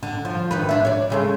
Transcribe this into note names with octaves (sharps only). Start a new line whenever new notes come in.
D3
F3
D2 D#3 B4
A#2 D4 E5
C#5 D5
C#3 G#3 A3